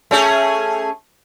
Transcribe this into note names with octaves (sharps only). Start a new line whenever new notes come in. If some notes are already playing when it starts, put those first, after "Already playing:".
A3 C#4 G#4